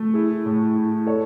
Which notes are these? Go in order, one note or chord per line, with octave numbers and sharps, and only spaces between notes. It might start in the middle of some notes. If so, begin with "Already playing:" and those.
Already playing: A3
E4 G#4
A2
E4
A4 C#5